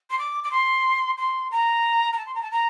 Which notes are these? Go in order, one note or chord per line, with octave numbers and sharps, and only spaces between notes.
C6
D6
D6
C6
C6
A#5
A#5
A5
C6
A#5
A5
A#5